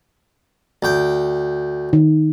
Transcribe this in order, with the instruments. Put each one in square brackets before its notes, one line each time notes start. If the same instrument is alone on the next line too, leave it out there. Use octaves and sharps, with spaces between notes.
[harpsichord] D2 G5
[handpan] D#3